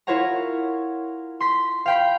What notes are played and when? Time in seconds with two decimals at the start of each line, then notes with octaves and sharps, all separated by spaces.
0.07 E4 F4 A#4 C#5 F#5 A#5
1.40 C6 B6
1.86 F5 G5 B5